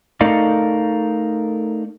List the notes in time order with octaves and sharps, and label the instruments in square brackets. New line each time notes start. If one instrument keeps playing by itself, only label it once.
[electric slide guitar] A3 D#4 A4 A#4 D5 F5